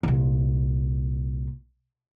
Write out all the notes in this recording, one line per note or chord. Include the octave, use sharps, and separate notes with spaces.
C2 A#2